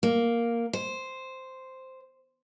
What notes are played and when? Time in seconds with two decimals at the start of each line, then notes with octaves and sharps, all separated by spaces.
0.03 A#3
0.73 C5